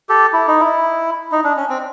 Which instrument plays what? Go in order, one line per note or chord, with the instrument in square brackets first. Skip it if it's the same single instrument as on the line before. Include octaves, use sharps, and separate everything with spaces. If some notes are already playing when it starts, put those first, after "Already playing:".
[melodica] G4 A4
E4
D#4
E4
D#4
D4
C#4
C4